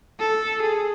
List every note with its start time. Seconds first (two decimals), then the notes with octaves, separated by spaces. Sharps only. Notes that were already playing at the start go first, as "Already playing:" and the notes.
0.19 A4
0.62 G#4